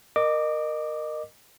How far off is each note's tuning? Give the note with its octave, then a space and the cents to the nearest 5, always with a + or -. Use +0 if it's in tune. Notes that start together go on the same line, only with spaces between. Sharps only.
A#4 +5 D#5 -25 D6 +0